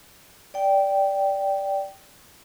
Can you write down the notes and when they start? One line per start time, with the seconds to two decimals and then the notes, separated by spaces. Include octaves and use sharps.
0.54 D5 G5